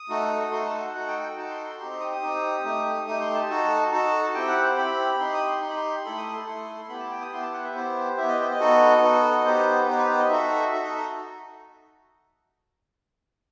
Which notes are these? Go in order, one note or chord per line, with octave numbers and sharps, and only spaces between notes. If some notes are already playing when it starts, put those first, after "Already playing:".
Already playing: D#6
A3 D#4 F#4 A4
A3 D#4 F#4 A4 C6
A5
F#5
D#4 F#4 A4 F#5
G5
G5
D#4 F#4 A4 A5
C6
C6
C4 D#4 G4 C6
C6
D#6
D#6
C4 D#4 G4
A3 D#4 G4
A3 D#4 G4 D#6
C6
A5
D#4 F#4 A4
D#4 F#4 A4
C4 E4 G4 G5
F#5
C5
C4 E4 G4 B5
D#4 G4 C6
D#6
C6
D#4 G4 C6
B5
C6
A3 E4 A4 B5
D#6
C6
A3 E4 A4 C6
B3 E4 G4 B5
A5
G5
D#6
B3 E4 G4 C6
A5
F#5
E5
B3 E4 G4 C5
B3 E4 G4 E5
D#5
C5
D#5
B3 D#4 F#4 A4
B3 D#4 F#4 A4
B3 D#4 G4 C5
B4
B3 D#4 G4 C5
B4
C5
D#5
D#4 F#4 A4 E5
D#4 F#4 A4 E5
D#5
D#5